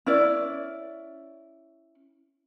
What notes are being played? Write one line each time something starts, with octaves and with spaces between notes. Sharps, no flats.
C#4 E4 D5